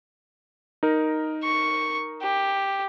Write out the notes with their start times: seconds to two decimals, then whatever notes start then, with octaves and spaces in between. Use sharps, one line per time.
0.83 D#4 A#4
1.43 C#6
2.22 G4